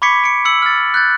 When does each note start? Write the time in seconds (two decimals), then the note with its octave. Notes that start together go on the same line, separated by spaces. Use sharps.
0.02 B5 C#6 D6 G#6 B6 C#7
0.24 C#7 D7
0.45 E6 C#7 F#7
0.62 F6 A6
0.94 F#6 G6 A6